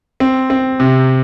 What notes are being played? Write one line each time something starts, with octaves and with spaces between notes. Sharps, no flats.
C4
C4
C3